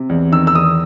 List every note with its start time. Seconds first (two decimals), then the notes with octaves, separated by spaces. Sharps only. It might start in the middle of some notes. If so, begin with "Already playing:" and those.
Already playing: C3
0.09 E2
0.32 D#3 E6
0.47 E6
0.55 E2 D#6